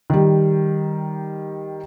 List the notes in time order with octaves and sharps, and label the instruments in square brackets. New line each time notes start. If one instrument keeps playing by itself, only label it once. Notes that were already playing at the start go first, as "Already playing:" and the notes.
[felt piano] D#3 G3